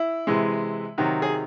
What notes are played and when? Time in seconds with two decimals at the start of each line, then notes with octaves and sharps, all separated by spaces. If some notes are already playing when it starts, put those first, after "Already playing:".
Already playing: E4
0.27 C3 E3 G#3
0.98 C3 D#3 F#3 F#4
1.22 G#4